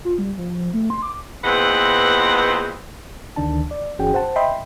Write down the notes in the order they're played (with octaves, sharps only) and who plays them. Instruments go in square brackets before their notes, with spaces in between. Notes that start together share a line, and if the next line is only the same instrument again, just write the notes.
[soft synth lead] F4
G3
F3
A3
C6
D6
[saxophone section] E2 A#2 C4 B4 D#5 F#5
[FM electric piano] D2 D3 D#3 D4 A5
D5
G1 E3 C#4 F#4 G#4 G5
C5 F#5 A5
D#5 E5 G5 B5 C6